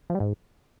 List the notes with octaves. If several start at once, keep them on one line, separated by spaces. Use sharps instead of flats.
F3
G3
G#2